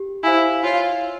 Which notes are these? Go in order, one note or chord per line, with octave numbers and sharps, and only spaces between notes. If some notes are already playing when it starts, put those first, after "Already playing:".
Already playing: G4
E4 C5 F5 G#5
F4 C#5